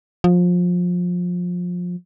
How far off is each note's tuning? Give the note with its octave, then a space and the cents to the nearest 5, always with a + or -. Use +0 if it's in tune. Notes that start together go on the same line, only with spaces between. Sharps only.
F3 +25